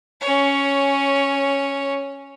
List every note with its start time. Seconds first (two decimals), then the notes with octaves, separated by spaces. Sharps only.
0.21 C#4 C#5